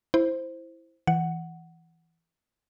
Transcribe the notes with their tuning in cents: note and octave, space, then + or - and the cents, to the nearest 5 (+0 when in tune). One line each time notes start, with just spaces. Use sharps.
E4 +0 C5 +0
E3 +0 F#5 +0